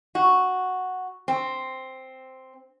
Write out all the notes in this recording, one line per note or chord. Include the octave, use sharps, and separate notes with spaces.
F#4
C4